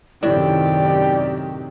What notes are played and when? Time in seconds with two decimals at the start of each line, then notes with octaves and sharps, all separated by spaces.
0.23 F#2 A2 C3 D#3 D4 G4 D5